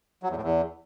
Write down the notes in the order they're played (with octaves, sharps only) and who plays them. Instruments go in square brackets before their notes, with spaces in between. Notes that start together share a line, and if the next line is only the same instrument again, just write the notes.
[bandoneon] F#3
E2
A2
E2